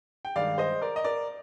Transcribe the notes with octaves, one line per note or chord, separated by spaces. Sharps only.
G5
G2 D#3 G#3 D5 F5
C5 D#5
A#4 D5
D#5
A#4 D5